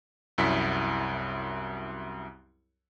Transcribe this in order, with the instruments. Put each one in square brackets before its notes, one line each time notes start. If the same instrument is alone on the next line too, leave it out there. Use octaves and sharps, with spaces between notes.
[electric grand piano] C2 F#2 E4 B6